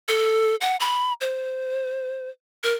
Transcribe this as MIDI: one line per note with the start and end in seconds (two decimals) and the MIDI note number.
0.08 0.56 69
0.61 0.76 78
0.80 1.13 83
1.21 2.29 72
2.63 2.74 70